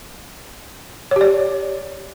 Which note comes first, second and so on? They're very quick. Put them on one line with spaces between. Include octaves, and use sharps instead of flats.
C#5 G4 D5